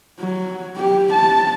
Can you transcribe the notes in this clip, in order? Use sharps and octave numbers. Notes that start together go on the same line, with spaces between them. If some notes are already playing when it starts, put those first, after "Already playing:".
F#3
G4
A5